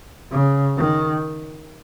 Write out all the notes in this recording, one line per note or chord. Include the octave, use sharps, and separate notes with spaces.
C#3
D#3